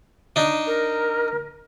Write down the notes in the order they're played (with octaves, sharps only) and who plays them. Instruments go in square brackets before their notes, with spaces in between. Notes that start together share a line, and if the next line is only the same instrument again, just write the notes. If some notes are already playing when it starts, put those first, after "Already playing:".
[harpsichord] D4 D#4
[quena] A#4